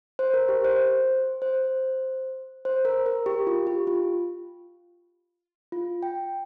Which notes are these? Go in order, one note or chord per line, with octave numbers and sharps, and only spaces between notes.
C5
A#4
G4
C5
C5
C5
A#4
A#4
G4
F4
G4
F4
F4
G5